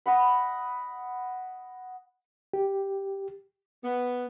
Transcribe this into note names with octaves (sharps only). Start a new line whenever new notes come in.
D#5 F#5 B5
G4
B3